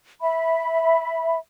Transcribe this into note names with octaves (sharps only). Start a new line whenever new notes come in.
E5 B5